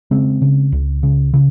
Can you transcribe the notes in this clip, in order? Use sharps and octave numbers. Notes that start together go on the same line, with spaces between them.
C#3 G#3 C4
C#3
C#2
C#3
C#3